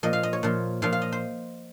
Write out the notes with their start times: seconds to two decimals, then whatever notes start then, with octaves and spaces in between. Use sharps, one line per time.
0.03 A#2 F3 D#5
0.13 F5
0.23 D#5
0.33 C#5
0.43 A#2 F3
0.82 A#2 F3 F5
0.92 F5
1.02 D#5
1.12 C5